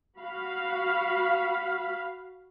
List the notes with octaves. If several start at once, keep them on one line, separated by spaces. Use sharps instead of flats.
F#4 F5 B5